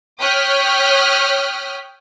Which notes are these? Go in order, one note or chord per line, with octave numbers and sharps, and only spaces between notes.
C#5 G5 D#6 F6 F#6 B6